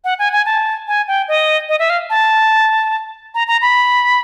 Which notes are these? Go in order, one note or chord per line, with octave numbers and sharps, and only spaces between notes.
F#5
G#5
G#5
A5
G#5
G5
D#5
D#5
E5
F5
A5
A#5
A#5
B5